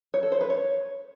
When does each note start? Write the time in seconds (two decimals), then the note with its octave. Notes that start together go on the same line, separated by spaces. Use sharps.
0.14 C#5
0.23 A4
0.32 C5
0.41 B4
0.50 C#5